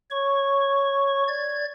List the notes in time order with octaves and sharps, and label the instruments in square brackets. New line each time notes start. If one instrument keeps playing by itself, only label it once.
[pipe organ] C#5 C#6
D5 G#6